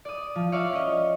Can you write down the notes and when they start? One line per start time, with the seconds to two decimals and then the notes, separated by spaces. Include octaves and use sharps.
0.05 D5 D#6
0.35 F3
0.52 C#5 D5 E5 F5
0.73 C#4 D#5